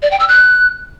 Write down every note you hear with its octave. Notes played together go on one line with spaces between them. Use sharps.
D5
G5
E6
F#6